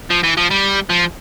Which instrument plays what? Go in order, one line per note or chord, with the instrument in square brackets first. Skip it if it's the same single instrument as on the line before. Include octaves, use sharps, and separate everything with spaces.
[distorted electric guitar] F3
E3
F3
G3
F3